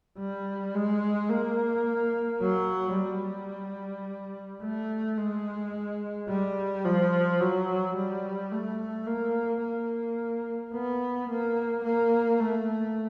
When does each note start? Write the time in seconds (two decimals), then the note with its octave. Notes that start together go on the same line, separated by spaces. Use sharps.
0.19 G3
0.74 G#3
1.30 A#3
2.41 F#3
2.97 G3
4.63 A3
5.18 G#3
6.29 G3
6.85 F3
7.41 F#3
7.96 G3
8.52 A3
9.07 A#3
9.62 A#3
10.74 B3
11.30 A#3
11.85 A#3
12.40 A3